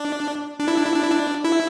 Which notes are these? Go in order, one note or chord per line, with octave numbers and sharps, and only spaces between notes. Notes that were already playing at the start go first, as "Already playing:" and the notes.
Already playing: D4
D4
E4
D4
E4
D4
E4
D4
E4